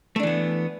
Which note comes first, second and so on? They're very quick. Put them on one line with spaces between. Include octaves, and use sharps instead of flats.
A3 D4 E3 B3